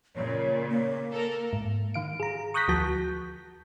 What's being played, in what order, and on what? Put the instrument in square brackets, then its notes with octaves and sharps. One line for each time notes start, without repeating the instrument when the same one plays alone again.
[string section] A#2 C#3 [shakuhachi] C#5
[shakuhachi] A#3
[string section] A4 A#4
[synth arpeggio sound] G#2
D#3 F5 D7
G#4 A#5
C#6 D#6 F#6 G6 A#6 B6
D2 F3 F#4 A5 G6